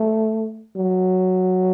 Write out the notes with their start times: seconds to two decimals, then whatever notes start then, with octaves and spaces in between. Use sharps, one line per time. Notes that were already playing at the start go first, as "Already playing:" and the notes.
Already playing: A3
0.76 F#3